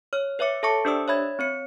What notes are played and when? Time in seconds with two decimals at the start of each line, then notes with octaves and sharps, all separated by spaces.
0.13 C#5 F6
0.39 B4 C#5 E5 D6 C#7
0.63 A4 E5 A5 C#6 D6 C#7
0.85 D4 G4 C5 D5 D#6 E6
1.08 C#5 E5 B5 G#6
1.39 C4 C#5 C#7